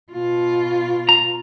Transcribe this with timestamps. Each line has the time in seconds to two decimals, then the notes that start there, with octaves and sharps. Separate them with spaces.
0.12 B2 F4
1.09 A#5